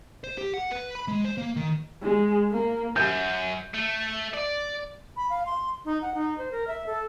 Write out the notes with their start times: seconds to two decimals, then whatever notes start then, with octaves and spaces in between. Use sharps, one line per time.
0.24 C5
0.38 G4
0.54 F#5
0.71 B4
0.95 B5
1.08 G#3
1.25 C5
1.38 A#3
1.56 D#3
2.02 G#3
2.52 A#3
2.96 F#2 G6
3.74 A3
4.34 D5
5.16 B5
5.30 F5
5.46 C6
5.85 D#4
6.02 F#5
6.14 D#4
6.38 C5
6.52 A#4
6.67 E5
6.86 A4